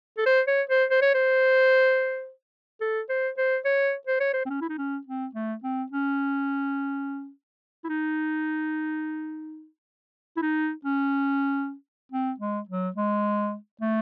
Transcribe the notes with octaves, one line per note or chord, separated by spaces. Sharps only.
A4
C5
C#5
C5
C5
C#5
C5
A4
C5
C5
C#5
C5
C#5
C5
C4
C#4
E4
D#4
C#4
C4
A3
C4
C#4
E4
D#4
E4
D#4
C#4
C4
G#3
F#3
G#3
A3